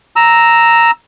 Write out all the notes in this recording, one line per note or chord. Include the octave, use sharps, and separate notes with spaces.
A#5 E6